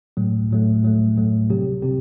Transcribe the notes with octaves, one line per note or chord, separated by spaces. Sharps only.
A2 F#3 A3
A2 F#3 A3
A2 F#3 A3
A2 F#3 A3
C3 F#3 C4 G4
C3 F#3 C4 G4